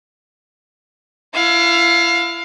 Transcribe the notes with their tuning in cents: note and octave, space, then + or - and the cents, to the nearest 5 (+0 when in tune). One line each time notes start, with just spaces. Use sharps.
E4 +40 F5 +20